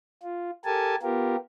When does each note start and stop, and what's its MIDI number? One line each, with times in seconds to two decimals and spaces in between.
0.23 0.51 65
0.65 0.95 67
0.65 0.95 69
0.65 0.95 70
0.65 0.95 80
0.65 0.95 81
1.02 1.36 59
1.02 1.36 65
1.02 1.36 67
1.02 1.36 70